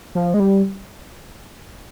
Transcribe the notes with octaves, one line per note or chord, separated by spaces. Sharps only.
F3
G#3
G3